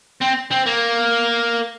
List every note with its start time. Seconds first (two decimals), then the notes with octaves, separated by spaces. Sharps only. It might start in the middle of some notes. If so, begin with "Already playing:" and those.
0.21 C4
0.51 C4
0.66 A#3